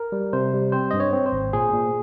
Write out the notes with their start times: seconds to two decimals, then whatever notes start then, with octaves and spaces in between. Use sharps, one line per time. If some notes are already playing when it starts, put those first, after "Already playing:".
Already playing: A#4
0.12 G3
0.33 C3 C5
0.53 G3
0.72 C4 C5
0.91 G2 D#5
1.00 C#5
1.13 C4
1.26 C5
1.32 G#1
1.53 A#2 G#4
1.73 A#2